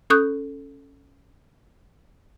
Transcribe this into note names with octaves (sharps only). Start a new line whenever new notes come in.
C#4 A4 C#6 D#6 F#6 G6